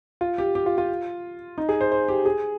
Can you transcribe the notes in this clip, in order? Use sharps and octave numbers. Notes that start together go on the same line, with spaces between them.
F4
G4
G4
F4
F4
D#4
G#4
C5
C5
G4
G#4